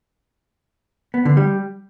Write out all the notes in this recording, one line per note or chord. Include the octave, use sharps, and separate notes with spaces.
B3
D3
G3